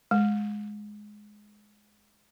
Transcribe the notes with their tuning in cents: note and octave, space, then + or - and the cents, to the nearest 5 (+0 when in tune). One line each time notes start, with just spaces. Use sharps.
G#3 +10